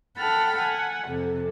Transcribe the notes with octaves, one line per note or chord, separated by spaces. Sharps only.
A4 F#5 G5 B5 F6
F#5 G#5
F2 C3 A4